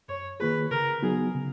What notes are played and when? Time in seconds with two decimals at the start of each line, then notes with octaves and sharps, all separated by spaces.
0.09 F#2 C#5
0.40 D#3 A#3 F4 G#4 B4
0.71 C#3 A#4
1.03 F#3 B3 D#4 F#4 G#4
1.35 C#3